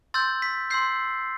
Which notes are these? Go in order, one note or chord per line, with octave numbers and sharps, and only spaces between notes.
C6 E6 G6 A6
B6
C6 E6 G6 C7